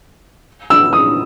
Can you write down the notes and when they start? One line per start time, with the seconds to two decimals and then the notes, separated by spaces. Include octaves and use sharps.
0.70 E6
0.93 D#6